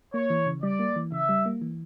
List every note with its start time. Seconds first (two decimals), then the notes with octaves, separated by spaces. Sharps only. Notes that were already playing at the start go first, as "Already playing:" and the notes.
0.14 A#3 C#5
0.30 E3
0.46 C#3
0.62 G3 D5
0.79 A#3
0.96 E3
1.12 C#3 E5
1.29 G3
1.46 A#3
1.62 E3